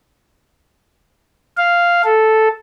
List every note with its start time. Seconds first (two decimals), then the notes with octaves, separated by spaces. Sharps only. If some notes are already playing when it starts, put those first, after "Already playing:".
1.57 F5
2.04 A4